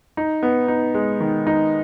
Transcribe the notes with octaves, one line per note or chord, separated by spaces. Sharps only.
D#4
B3
D#4
G#3
D#3
D#4